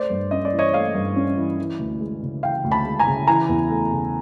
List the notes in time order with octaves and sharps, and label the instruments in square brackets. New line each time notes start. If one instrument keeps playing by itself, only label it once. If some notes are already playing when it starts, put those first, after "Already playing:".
Already playing: [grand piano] A3 C5 D5
G2
C#4 D#5
D5
E3
C#5 D#5
A3 D#5 F5
G2
C#4
E3
E3
D2
G#3
C#3
E3 F5 G5
D2
A5 B5
G#3
G#5 A#5
C#3
E3 G#5 A#5
E2
A3
C#3